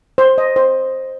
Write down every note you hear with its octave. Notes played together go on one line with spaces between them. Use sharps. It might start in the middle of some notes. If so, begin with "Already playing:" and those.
C5
D#5
C5